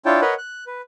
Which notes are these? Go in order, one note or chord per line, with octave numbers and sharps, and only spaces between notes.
D4 E4 F4 C#5 G5 A5
A#4 B4 C#5 D#5 F#5 B5
F#6
B4